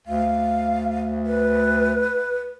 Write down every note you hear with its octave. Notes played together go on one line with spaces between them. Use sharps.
D2 F5
B4